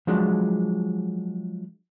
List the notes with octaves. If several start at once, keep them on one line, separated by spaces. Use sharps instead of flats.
F3 F#3 G#3 D4